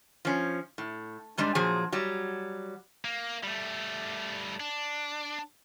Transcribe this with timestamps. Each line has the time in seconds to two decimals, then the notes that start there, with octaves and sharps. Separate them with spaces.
0.25 F3 C#4
0.78 A2
1.38 G#2 G3 G#3 D4
1.55 A#2 F3 F#3 G#4
1.92 F#3 G3
3.05 A#3
3.43 G3 A3
4.60 D4